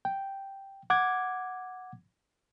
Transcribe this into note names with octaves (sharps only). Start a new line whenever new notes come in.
G5
F#5 D6 G#6